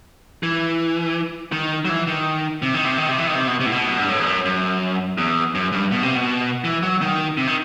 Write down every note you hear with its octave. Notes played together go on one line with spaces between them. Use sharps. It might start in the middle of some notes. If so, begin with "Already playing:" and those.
E3
D#3
F#3
E3
D#3
C3
D#3
C3
D#3
C3
E3
D#3
C3
B2
C3
A2
B2
F#2
G2
A2
E2
F#2
F#2
E2
F#2
G2
B2
C3
B2
E3
F#3
D#3
C3
D#3